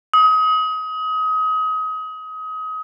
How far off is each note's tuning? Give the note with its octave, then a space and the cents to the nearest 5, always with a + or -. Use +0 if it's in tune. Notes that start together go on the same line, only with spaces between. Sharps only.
D#6 +30